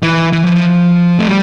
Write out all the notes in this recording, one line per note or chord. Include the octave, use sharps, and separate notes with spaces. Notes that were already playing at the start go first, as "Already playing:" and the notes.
E3
E3
F3
A3
G3